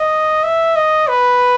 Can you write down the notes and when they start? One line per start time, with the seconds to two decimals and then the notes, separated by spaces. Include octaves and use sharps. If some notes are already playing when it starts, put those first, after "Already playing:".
Already playing: D#5
0.44 E5
0.76 D#5
1.08 B4